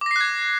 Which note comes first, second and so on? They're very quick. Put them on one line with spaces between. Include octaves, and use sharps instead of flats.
D6 A#6 C7 F#6 G#6